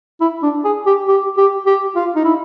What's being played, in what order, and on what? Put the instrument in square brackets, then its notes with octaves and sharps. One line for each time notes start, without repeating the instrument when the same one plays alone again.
[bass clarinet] E4
D4
G#4
G4
G4
G4
G4
F4
D#4
E4